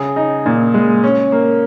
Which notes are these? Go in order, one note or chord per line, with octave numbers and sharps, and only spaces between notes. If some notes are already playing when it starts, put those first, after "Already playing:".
Already playing: C#3 G#4
D#4
A#2
G#3
C#4
A#3